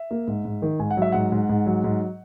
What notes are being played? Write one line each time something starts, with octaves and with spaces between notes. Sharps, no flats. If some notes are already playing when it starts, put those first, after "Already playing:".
Already playing: E5
A#3
G#2
G#2
D#3
G#2 G#5
F#5
F#3 E5
G#2 F#5
G#2
G#2
F#3
G#2